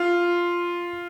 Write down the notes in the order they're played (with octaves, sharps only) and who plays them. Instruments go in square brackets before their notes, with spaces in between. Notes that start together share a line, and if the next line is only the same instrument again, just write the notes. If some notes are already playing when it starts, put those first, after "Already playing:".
Already playing: [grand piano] F4